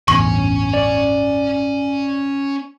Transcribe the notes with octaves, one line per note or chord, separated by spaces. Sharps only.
A1 E2 G2 C#4 G#5 C#6
D5